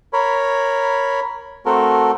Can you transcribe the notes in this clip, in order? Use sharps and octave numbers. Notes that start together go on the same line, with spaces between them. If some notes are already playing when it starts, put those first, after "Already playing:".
A#4 C#5 B5
A3 C4 F#4 A4 A#4